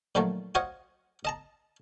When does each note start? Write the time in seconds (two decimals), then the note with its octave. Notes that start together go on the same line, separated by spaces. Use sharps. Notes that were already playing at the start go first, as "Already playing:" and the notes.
0.15 A#2 D#3 F3 F#3 A3
0.55 F4 F#4 C5 C#5 D#5
1.25 D#5 A5 A#5